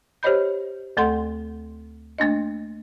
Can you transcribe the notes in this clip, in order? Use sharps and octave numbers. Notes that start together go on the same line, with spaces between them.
G4 C5 C#5 D#5 B5 G6
D2 A3 A4 F#5 C6
A3 A#3 D4 D#5